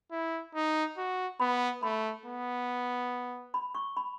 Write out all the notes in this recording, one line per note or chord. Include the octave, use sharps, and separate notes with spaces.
E4
D#4
F#4
B3 B5
A3 B5
B3
B5
C#6
B5